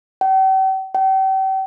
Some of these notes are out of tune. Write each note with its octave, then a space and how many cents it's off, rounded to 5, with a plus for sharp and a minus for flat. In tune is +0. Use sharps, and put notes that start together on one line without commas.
G5 -45
G5 -40